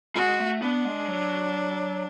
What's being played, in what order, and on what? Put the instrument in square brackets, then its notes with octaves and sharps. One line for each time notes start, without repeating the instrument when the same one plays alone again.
[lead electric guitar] G#3 [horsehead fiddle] F#4
[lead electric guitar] A3
[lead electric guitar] B3 [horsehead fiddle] D4
[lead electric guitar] G#3
F#3